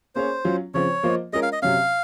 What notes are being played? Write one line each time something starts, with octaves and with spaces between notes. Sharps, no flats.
A#3 C#4 G#4 C5 C#5
F#3 C#4 F4
C#3 F3 C4 C#5
F3 A#3 F4 C5 D#5
G#3 C#4 F4 A#4 D#5
F5
D#5
C3 F#3 C#4 F5